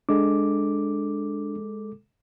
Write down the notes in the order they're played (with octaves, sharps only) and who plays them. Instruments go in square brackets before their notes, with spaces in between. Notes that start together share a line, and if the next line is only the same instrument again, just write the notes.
[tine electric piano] G#3 A4 D6 [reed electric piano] D4